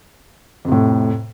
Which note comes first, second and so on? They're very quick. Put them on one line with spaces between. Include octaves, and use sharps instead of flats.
F2 C3 A2